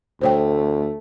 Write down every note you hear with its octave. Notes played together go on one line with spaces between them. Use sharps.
D2 A3 C5 C#5 G5